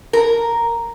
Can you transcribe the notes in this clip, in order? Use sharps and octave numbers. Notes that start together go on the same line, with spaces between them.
A#4